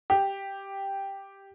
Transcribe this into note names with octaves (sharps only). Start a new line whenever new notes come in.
G4